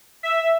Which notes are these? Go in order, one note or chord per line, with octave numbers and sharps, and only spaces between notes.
E5